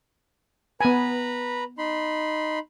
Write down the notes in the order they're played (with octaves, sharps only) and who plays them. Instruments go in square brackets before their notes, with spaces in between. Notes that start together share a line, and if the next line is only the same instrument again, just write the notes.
[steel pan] B3 G#5 [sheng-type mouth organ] B4 A#5 B5
[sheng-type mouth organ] D#4 B5 C6